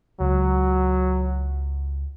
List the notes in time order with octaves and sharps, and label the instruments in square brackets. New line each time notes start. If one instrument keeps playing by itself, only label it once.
[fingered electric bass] C#2 [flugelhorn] F#3